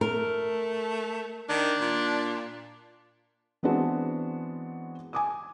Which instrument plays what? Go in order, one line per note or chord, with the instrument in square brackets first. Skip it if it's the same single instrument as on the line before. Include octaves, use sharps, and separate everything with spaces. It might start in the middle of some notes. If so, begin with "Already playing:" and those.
[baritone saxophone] A3 [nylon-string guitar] A#4
[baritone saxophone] D#3 [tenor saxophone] D4
[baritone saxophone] A#2
[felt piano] E3 G#3 B3 C4 D4 F#4
G#5 D6 D#6